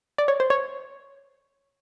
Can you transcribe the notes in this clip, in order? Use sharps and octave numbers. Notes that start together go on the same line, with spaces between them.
D5
C#5
C5
C#5